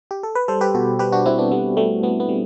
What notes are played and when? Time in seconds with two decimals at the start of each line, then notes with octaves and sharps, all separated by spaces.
0.11 G4
0.23 A4
0.35 B4
0.48 G3 A4 C5
0.61 G4 B4
0.74 B2 F#4 A4
0.99 G3 G4 B4
1.12 D4 F#4
1.26 G3 C4 E4
1.38 B3 D4
1.51 G3 B3
1.77 G3 A3
2.03 G3 B3
2.20 B3
2.29 G3